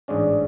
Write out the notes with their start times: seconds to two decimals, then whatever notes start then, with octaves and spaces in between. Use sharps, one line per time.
0.08 A1 G#2 G#3 C#4 D4